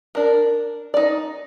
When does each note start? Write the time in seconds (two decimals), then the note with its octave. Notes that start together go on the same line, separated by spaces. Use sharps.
0.15 D4 A#4
0.94 D#4 D5